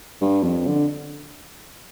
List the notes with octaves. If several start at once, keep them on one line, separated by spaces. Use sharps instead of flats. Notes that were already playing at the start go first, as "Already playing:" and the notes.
G2
F2
D3